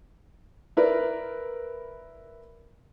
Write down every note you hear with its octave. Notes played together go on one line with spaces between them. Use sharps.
E4 A#4 B4 D5